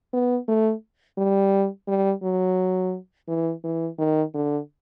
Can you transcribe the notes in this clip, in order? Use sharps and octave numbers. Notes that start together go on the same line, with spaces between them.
B3
A3
G3
G3
F#3
E3
E3
D#3
D3